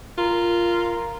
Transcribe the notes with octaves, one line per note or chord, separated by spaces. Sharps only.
F4 A#4